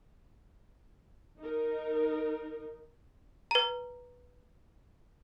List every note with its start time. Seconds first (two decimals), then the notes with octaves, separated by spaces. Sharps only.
1.39 D#4 A#4
3.51 B4 A#5